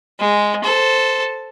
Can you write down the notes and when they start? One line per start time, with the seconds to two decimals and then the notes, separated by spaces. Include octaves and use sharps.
0.19 G#3
0.64 A4 C5